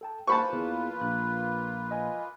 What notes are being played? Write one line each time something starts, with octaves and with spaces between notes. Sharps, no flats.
A4 G5 A5
A#3 F4 B4 C5 A5 B5 C#6
E2 G#4
A#1 F#6
D#5 G#5